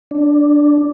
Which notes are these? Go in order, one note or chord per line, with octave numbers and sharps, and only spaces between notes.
D4